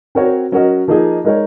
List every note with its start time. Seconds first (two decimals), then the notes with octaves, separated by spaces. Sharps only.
0.15 C4 F#4 A#4 C#5
0.52 F#3 C#4 F#4 A#4 D#5
0.88 F3 A#3 D#4 G#4 D#5
1.24 G#3 D#4 A#4 C#5